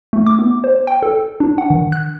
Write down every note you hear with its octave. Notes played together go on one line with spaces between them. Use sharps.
A3
D6
B3
C5
G5
A4
D4
F#5
D#3
F#6